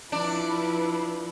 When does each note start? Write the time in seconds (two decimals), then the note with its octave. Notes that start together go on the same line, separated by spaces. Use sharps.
0.12 F3 D4 E4 B4